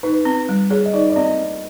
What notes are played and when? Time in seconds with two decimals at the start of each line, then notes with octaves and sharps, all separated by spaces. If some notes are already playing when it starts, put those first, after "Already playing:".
0.03 D#4 B4
0.25 C4
0.49 G3
0.70 G#4 C#5
0.85 D#5
0.93 D#4 D5
1.10 D5
1.16 C4 D#5